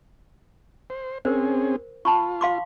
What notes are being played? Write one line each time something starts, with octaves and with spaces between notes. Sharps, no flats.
C5
C4 C#4 G#4 A#4 C5
F4 A5 B5 C#6
F5 C6 D6